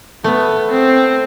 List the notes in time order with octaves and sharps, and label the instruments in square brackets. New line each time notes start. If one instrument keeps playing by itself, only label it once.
[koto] A3 [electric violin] B3
[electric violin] C4